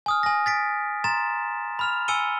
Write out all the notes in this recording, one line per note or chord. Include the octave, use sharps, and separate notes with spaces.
G#5 D#6 F6
G#5 A#6
A6 B6 D7
A#5 C6 A6 E7
B5 F6 F7
G#5 E6 C#7 D#7 G7